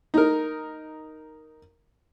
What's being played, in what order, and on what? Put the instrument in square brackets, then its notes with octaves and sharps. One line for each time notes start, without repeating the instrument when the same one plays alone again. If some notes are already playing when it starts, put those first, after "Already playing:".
[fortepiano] D#4 A#4